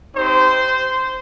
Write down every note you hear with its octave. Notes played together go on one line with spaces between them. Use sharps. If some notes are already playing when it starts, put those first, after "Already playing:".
C4 D#4 G4 C5